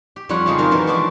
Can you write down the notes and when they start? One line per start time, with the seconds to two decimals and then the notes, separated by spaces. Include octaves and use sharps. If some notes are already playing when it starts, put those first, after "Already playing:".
0.16 G4
0.29 F2 G3 F4 C#5 F#5
0.46 C#3 F3 G#3 D#4
0.58 D#3 F#3 C4 F4 A#4
0.71 B2 E3 A#4 C5
0.87 E3 F3 G#3 D4 F#4 D5